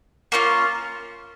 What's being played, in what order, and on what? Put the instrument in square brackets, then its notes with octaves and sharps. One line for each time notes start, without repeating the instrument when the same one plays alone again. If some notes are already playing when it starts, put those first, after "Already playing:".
[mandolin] A#3 C#4 F4